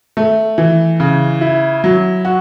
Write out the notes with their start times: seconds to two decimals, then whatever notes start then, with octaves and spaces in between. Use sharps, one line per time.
0.17 A3
0.58 E3
1.00 C#3
1.41 E4
1.84 F#3
2.25 F#4